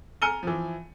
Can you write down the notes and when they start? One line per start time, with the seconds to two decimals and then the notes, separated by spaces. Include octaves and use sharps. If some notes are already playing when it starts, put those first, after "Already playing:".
0.22 G#5 A#5 F6 C#7 D#7 G7
0.43 E3 F3